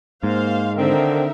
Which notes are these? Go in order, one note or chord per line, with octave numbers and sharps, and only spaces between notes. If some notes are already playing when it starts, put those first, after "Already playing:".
G#2 A#3 C5 F5
D3 D#3 C4 D#4 A#4 E5